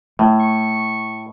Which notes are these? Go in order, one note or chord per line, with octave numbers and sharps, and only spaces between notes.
A2 A3
C#6